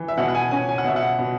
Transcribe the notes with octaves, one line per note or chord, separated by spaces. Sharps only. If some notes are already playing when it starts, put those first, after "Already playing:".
Already playing: E3
E5
B2 F#5
F#5
G#5
C#4 G#5
G#5
F#5
B2 E5
F#5
B2